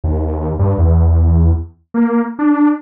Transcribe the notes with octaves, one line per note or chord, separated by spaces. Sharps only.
D#2
G2
E2
A#3
D4